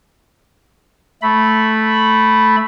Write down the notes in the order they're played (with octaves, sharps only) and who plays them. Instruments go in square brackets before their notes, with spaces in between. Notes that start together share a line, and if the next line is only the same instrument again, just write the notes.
[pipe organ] A3 B5